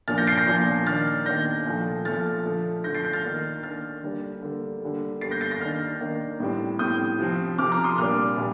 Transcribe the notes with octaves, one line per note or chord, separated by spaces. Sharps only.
A#2 F3 A#3 D4 F6 A6
G6 A#6
A6 C7
G6 A#6
A#2 F3 A#3 D4
D#3 A#3 D4 F6 A6
D#3 A#3 D4 G6 A#6
A#2 F3 A3
A#2 F3 A3 F6 A6
D3 F3 A3
D3 F3 A3 G6 A#6
A6 C7
G6 A#6
F6 A6
D#3 A#3 D4
D#3 A#3 D4 F6 A6
D3 G3 A#3 D4
D3 G3 A#3 D4
D3 G3 A#3
D3 G3 A#3 A6 C7
G6 A#6
A6 C7
G6 A#6
D#3 A#3 D4 F6 A6
D#3 A#3 D4
A2 G3 C4
A2 G3 C4 D#6 G6
C3 F3 C4
C3 F3 C4 D6 F6
A#5 D6
C6 D#6
A#2 G3 A#3 D4 D6 F6
A#2 G3